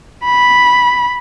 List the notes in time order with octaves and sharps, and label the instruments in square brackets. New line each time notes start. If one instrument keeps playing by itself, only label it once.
[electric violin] B5